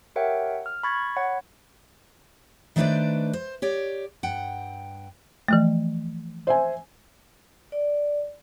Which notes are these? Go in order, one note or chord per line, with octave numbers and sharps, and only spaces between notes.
G4 A#4 C#5 E5 F#5 G5
F6
B5 C#6 G#6 A6
C#5 F#5 B5
D#3 A3 D4 B4 C5 D5
C5
G4 C#5 D5
G2 F#5 G5
E3 F3 A3
C5 E5 G#5
D5